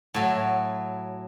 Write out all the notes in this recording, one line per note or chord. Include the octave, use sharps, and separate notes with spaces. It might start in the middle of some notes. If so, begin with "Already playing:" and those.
A2 F#3